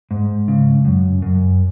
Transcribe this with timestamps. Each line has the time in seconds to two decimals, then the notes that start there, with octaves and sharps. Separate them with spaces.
0.11 G#2
0.48 C#3
0.85 F#2
1.22 F#2